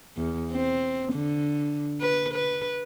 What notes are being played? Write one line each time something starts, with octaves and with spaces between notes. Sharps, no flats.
E2
C4
D3
B4
B4